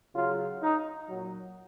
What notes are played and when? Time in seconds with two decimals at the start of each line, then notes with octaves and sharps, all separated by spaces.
0.13 C#3 F#3 F4
0.61 D#4
1.08 A#2 F#3